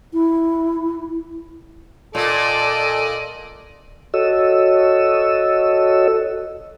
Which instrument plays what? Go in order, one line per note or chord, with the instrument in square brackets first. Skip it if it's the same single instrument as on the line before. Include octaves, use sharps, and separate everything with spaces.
[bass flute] E4
[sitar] A#2 [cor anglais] A4 [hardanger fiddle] D5 D#5
[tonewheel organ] F#4 A4 C#5 D#5 E6